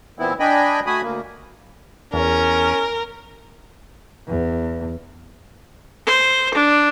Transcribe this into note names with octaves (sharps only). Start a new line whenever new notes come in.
A#2 E3 B3 C4 E4
D4 D#5 G5 G#5 B5
A3 F#4 G#5 B5 D#6
D2 A#3
E2 C#4 A#4
E2
C5
D4